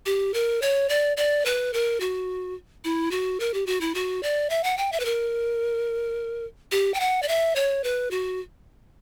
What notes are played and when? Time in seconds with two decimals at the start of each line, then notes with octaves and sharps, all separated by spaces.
0.06 G4
0.34 A#4
0.62 C#5
0.89 D5
1.17 D5
1.45 B4
1.73 A#4
2.00 F#4
2.84 E4
3.11 F#4
3.40 A#4
3.54 G4
3.66 F#4
3.81 E4
3.94 F#4
4.23 D5
4.50 E5
4.63 F#5
4.77 G5
4.92 E5
5.00 B4
5.05 A#4
6.72 G4
6.94 G5
7.00 F#5
7.22 D5
7.28 E5
7.55 C#5
7.84 B4
8.11 F#4